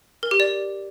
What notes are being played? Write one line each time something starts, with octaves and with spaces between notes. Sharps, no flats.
A#4
G4
D5